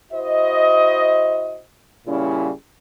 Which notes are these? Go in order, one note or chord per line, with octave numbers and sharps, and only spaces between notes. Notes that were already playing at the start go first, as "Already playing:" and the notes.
E4 F#4 C5 D#5
A#2 C#3 G3 C#4 E4